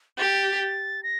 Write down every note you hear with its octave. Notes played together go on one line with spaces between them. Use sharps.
G4 A6
A#6